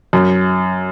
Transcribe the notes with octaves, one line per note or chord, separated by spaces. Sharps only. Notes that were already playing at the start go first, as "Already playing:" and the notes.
F#2